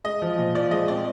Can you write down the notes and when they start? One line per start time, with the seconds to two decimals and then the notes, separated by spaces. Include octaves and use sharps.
0.04 G#3 D#5
0.22 F3
0.38 A#2
0.55 F3 D5
0.71 G#3 D#5
0.88 C4 D5